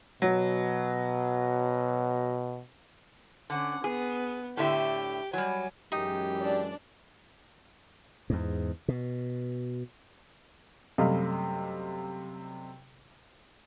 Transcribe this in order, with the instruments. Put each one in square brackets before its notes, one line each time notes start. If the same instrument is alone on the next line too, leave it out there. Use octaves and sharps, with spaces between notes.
[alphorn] B2 [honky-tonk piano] F#3
[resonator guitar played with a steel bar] D3 [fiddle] C#4 F#5
[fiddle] B3 [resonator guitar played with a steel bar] G#4
[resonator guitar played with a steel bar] A2 D3 E5 [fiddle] G4
[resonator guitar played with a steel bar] F#3 G3 [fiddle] G#5
[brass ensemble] F#2 E3 G#3 [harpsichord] D#4 [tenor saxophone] G4
[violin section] D4 D5
[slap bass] E2 G#2
B2
[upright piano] F#2 C3 G3 A3 D#5 F5